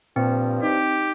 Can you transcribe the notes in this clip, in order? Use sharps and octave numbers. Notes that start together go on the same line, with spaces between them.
G2 A#2 F3 C4
D#4 G4